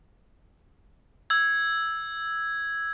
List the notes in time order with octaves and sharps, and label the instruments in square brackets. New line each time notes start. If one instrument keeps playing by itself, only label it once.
[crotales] E6 G#6